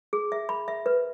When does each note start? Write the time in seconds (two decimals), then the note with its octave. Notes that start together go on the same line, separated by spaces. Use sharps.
0.13 G#4
0.32 E5
0.49 B5
0.68 E5
0.86 B4